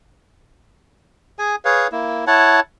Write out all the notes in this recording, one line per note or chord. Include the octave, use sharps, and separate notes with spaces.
G#4 G#5
G#4 B4 C#5 F5
A#3 E4
E4 C#5 F#5 A5